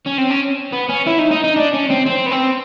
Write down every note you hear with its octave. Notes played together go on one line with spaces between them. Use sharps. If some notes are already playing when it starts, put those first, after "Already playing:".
C#4
C4
C#4
B3
C#4
E4
D#4
D#4
D#4
D4
C#4
C4
C4
B3
C4